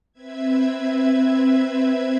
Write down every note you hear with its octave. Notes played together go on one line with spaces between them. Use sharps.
C4 B4 E5 G#6